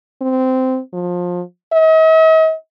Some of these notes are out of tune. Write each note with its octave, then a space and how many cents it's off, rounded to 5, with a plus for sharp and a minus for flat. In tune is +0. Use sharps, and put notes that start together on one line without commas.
C4 -15
F3 +25
D#5 +45